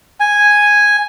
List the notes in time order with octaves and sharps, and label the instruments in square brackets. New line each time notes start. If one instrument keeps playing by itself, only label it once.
[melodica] G#5